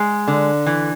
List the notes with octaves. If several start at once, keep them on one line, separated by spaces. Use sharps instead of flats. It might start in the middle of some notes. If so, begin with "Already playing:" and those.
Already playing: G#3
D3
E3